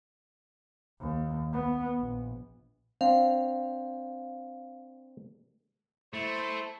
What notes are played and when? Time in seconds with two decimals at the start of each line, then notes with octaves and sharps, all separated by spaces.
1.00 D#2
1.53 B3
1.99 A#1
3.01 C4 D4 F5
6.13 A3 E4 C5